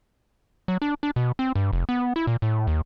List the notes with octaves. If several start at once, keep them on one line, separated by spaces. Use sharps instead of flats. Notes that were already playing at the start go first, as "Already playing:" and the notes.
F#3
D4
D4
B2
C4
G2
F1
B3
E4
A#2
A2
D#2